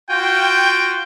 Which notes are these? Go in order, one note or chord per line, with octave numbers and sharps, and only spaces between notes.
F4 F#4 G5